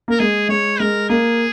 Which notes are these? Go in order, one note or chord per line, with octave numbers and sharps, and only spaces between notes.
A#3 A#4
G#3 G#4
G#3 C#5
G#3 A#4
A#3 G#4